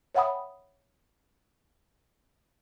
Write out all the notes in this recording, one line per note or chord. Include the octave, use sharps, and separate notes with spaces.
C#5 E5 F#5 G5 B5 D#6